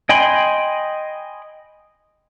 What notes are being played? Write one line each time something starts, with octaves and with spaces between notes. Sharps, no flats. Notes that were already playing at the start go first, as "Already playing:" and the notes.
D#5 G5 G#5 B5 C6